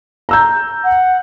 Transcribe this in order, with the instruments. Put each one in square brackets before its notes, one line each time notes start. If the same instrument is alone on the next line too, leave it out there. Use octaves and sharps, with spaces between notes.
[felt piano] A#5 E6 G6
[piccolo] F#5